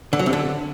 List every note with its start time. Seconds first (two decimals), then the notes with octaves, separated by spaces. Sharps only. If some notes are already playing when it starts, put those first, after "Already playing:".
0.13 D3
0.19 F#3
0.26 C3
0.33 D3